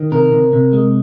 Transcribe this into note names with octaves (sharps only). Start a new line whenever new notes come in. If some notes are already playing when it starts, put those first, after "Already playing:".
Already playing: D#3
C3 A#4
C3
C3
G#3